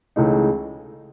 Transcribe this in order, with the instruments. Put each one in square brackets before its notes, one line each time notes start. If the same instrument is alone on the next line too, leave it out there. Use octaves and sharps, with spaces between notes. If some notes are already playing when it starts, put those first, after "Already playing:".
[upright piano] C#2 C#3 E3 A3 D#4